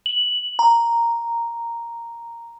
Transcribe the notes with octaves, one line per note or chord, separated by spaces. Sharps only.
F#7
A#5